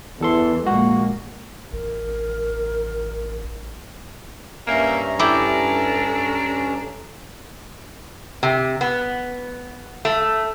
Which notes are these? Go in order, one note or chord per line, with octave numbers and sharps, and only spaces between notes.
E2 E3 A4 C6
A#1 G#3 A#3 F#4
A1 A#4
G2 A#3 C#4 E5 A#5
D4 E4 G4 A4
C3
B3
A3